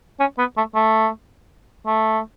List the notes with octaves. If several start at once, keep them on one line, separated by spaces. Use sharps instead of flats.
C#4
B3
A3
A3
A3